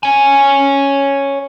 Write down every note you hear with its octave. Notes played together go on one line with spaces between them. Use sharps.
C#5 G#5